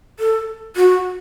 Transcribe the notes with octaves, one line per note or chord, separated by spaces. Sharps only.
A4
F#4